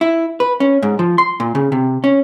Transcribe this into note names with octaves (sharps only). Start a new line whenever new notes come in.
E4
B4
C#4
G#2
F3
C6
A#2
C#3
C3
C#4